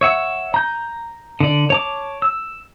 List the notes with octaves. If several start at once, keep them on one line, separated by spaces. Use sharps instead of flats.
C#5 E5 F#5
A#5 G6
D3 D5
C#5 A5 D6
E6